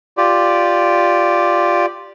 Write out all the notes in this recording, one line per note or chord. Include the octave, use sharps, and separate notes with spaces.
F4 G4 D5